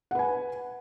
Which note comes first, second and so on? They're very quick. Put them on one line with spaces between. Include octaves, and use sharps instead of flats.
F#5 B4 G#5